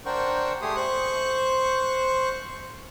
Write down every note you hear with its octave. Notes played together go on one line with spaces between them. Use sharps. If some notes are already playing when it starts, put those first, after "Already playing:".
D4 A#4 C5 F#5 G5 C#6
A3 G4 G#4 C6 D#6
C5 C#6 F#6